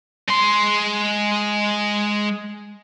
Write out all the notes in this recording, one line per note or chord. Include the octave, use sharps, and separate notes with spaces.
G#3 C6